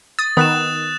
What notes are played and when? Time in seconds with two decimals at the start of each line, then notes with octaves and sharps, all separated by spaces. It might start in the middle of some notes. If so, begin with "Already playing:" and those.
0.19 D#6 A6
0.37 D#3 B3 D#6 F#6 E7